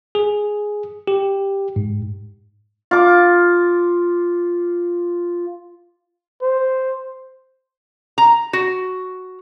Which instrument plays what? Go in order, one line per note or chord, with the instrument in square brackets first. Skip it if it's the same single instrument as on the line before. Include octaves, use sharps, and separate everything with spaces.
[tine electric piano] G#4
G4
G#2
[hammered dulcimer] F4 D6
[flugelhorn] C5
[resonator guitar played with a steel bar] A#5
F#4